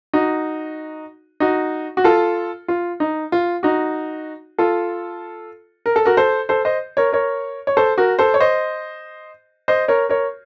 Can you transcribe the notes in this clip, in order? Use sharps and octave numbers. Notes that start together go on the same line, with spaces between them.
D#4 F#4
D#4 F#4
F#4
F4 A4
F4
D#4
F4
D#4 F#4
F4 A4
A#4
A4
F#4 A#4
A4 C5
A4 C5
C5 D#5
A#4 C#5
A#4 C#5
C#5
A4 C5
F#4 A#4
A4 C5
C#5
C5 D#5
C5 D#5
A#4 C#5
A#4 C#5